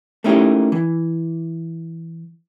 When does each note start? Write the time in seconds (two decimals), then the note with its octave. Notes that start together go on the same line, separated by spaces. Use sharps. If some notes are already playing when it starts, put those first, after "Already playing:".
0.24 A3 A#3 C#4 D#4 E4 G4
0.72 E3